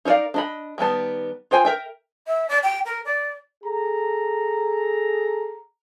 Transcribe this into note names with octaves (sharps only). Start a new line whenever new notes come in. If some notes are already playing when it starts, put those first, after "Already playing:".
D#4 A#4 C#5 D5 F5
D4 D#5 B5
D#3 G3 B3 A5
F4 C5 G5 G#5
A#4 E5 G5
E5
D5
G5
A#4
D5
G#4 A4 A#5